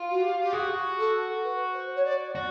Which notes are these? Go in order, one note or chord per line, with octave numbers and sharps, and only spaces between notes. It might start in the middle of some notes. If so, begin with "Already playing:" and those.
Already playing: F4
F#4
G4
G4
F#4 G#4
A4
B4
C5
C#5
D5
F#4 D5